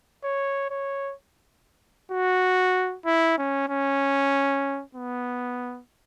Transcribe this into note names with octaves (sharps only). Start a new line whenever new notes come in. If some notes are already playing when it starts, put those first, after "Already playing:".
C#5
C#5
F#4
E4
C#4
C#4
B3